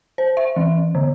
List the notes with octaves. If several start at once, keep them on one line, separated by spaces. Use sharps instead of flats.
C5
E5
E3
D3